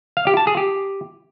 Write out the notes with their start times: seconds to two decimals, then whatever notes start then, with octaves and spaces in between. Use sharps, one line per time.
0.17 F5
0.27 G4
0.37 A5
0.47 G#4
0.57 G4